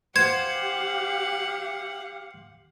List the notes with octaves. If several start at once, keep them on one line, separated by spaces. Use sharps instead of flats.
G4 C5 F5 F#5 G#6